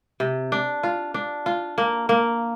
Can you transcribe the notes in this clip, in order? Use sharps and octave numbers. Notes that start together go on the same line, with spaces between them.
C3
D4
F4
D4
F4
A#3
A#3